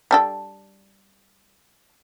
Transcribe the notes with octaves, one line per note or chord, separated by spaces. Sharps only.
G3 D4 A4